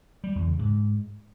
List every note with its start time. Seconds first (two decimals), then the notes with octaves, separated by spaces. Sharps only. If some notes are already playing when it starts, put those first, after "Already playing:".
0.24 G3
0.35 E2
0.47 C#3
0.59 G#2